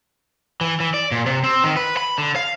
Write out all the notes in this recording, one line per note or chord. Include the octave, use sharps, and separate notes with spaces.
E3
E3
D5
A#2
C3
C4
D#3
B4
B5
D3
F5